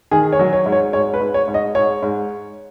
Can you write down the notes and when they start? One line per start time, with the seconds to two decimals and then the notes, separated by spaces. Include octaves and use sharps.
0.11 D#3 G#4
0.32 C#5
0.39 F#3
0.53 C#5
0.66 G#2
0.72 C#5
0.93 G#2 C#5
1.14 B4
1.21 G#2
1.34 C#5
1.47 G#2
1.54 D#5
1.75 G#2 C#5
2.02 G#2